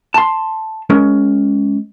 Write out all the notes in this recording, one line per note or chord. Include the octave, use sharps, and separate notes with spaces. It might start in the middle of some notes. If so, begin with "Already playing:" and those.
A5 C6
G#3 C#4 A#4